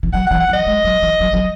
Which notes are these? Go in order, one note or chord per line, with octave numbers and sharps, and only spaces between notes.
E3
F#3 F#5
E3 F#5
F#5
F#3 D#5
G#3
F#3
E3
F#3
F#3